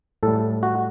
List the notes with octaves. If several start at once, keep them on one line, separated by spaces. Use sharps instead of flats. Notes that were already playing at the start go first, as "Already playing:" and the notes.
A2 G3 A4
F#4